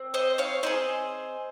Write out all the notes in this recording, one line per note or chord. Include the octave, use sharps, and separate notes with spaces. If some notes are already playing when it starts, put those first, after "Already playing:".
Already playing: C4
C5 D#5
C#5 F5
C4 D#4 G#4 C5 D#5